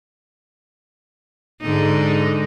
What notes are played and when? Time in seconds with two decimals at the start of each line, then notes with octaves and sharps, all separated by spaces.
1.62 G#2 D3 D#4